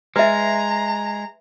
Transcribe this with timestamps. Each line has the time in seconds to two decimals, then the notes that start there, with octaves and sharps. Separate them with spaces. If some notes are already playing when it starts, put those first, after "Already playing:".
0.16 G#3 B4 E5 A#5